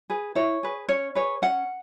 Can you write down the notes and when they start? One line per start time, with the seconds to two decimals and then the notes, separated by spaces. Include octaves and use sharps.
0.10 G#4 B4
0.35 E4 C#5
0.63 G#4 B4
0.89 C#4 C#5
1.15 G#4 B4 C#5
1.42 C#4 F#5